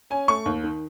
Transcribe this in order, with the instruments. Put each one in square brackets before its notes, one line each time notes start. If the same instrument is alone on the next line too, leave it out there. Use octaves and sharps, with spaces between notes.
[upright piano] C#4 G#5
A3 C#6
D#2
D#3